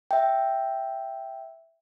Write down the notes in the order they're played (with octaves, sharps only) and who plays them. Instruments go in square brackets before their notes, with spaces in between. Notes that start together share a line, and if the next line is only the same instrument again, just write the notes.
[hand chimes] E5 G5